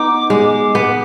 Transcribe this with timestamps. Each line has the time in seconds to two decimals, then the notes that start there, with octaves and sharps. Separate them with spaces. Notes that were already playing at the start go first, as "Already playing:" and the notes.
Already playing: B3 D#4 D6
0.30 G#3
0.75 B3